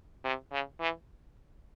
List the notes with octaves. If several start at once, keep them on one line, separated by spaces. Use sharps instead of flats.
C3
C#3
E3